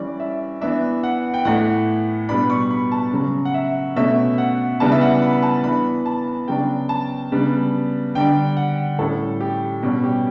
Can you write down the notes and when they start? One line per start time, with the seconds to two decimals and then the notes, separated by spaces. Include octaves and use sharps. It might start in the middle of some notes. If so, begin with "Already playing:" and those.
Already playing: E3 G3 C#4 D5
0.20 E5
0.61 E3 B3 D4 E5
1.03 F#5
1.34 G5
1.45 A2 E3 A3 F#5
2.29 B2 G3 B3 D4 B5
2.50 C#6
2.70 B5
2.92 A5
3.13 C#3 F#3 C#4
3.45 F#5
3.54 E5
3.96 B2 A3 C#4 E5
4.38 F#5
4.80 C#3 E3 G3 B3 D4 A5
4.92 E5
5.01 F#5
5.22 B5
5.33 B5
5.43 A5
5.64 E3 B3 D4 B5
6.06 A5
6.48 C#3 F#3 B3 D4 G5
6.89 A5
7.32 C#3 G3 B3 D4
8.15 D3 G3 D4 G5
8.57 F#5
8.98 A2 G3 C#4 A4
9.41 G4
9.82 B2 G3 C#4
10.04 G4